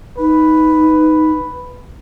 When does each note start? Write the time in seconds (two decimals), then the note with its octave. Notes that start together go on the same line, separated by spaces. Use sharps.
0.18 D#4 B4